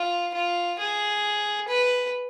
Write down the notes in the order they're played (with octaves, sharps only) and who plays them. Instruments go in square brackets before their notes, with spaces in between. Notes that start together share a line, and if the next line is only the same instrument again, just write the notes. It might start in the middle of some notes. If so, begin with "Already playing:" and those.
Already playing: [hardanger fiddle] F4
F4
G#4
B4